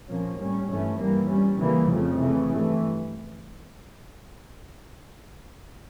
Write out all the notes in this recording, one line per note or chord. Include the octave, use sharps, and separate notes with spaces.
A#2 F3 A#3 C#4
A2 G3 C#4
G2 E3 A3 C#4
G2 E3 G3 A#3
A#2 G3 C#4
C#3 E3 G3 A#3
F2 C#3 F3 A3
C#3 E3 A3
G2 E3 A3